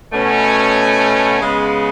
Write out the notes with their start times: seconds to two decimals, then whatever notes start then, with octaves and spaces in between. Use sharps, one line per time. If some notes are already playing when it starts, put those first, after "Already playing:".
0.12 B2 A3 C#4
1.41 C#3 G#3 B3